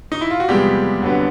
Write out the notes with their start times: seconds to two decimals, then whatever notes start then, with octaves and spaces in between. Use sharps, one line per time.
0.12 D#4
0.21 E4
0.31 F4
0.40 F#4
0.48 E2 C3 F3 G3 G#3 B3 G4
1.02 F2 D3 F#3 B3